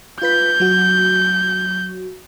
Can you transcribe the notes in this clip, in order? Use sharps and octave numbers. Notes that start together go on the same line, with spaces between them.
F4 B4 G6 B6
F#3 F#4